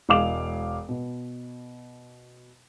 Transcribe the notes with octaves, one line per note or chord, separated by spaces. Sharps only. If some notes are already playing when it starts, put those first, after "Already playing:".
E1 G#3 F5 D6 F7
B2